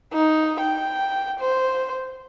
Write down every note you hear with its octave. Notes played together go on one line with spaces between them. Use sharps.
D#4
G5
C5